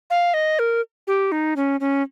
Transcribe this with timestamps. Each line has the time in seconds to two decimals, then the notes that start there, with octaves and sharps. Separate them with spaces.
0.10 F5
0.34 D#5
0.59 A#4
1.07 G4
1.32 D#4
1.56 C#4
1.80 C#4